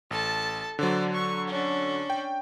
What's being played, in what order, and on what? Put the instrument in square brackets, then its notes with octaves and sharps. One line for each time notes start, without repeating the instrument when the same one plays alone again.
[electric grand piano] A1 [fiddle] A4 A5
[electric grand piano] D3 F#3 [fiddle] C5 D5
[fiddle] C#6
C#4 D4
[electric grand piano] G5